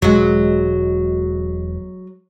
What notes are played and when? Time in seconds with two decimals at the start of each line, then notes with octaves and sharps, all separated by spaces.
0.02 E1 F#3 G#3